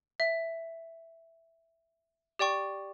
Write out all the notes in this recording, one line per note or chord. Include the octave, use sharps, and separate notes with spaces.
E5
G4 D5 G5 C#6